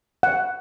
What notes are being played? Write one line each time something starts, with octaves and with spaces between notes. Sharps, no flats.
F#5